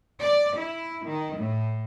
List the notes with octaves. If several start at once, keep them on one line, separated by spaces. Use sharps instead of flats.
D5
E4
D#3
A2